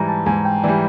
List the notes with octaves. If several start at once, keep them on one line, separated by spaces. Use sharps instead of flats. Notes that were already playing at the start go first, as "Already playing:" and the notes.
Already playing: G#2 E3 G3 A#5
A5
G#2 G#5
G5
E3 G3 D5